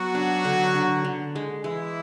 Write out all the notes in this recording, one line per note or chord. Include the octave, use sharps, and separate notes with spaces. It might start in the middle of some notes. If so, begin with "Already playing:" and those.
Already playing: F#3 B3 F#4
D4
D3
D3
D3
G#3
E3 G#3 E4